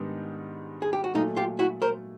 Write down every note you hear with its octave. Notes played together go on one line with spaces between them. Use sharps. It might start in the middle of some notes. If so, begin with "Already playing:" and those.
Already playing: G#2 D#3 G3 B3 D4
G#4
G4
F#4
A#2 F#3 A3 D#4 F4
F4 G4
E4 F#4
A#4 C5